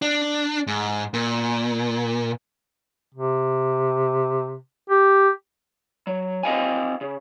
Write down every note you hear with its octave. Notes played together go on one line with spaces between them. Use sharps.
D4
G#2
A#2
C3
G4
F#3
C4 D#5 F5 G#5
C#3